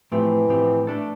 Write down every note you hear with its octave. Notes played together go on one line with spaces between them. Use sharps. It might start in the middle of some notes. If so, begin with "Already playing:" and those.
A2 E3 F3 A3 C4 G4
A2 F3 A3 C4 G4
A3 D4 A4